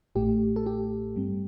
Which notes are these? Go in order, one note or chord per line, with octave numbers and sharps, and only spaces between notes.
A1 A2 A3 G4
A4
G4
G2 G3 C4